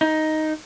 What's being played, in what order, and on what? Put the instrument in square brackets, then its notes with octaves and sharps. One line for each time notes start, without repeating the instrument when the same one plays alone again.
[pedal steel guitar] D#4